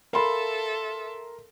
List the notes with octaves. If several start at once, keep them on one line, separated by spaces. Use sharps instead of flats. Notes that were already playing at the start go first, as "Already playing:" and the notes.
A4 A#4 E5 F5 B5 C6